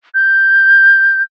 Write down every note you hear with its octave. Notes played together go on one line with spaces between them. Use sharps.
G6